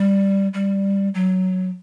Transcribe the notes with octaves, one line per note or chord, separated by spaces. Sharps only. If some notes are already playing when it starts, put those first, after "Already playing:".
Already playing: G3
G3
F#3